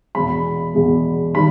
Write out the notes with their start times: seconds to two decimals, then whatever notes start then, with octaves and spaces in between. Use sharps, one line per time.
0.15 E2 B2 G#3 B5
0.74 E2 B2 G#3
1.35 D#3 G3 B5